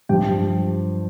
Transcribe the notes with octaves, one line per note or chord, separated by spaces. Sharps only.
G2 F3 G4 G5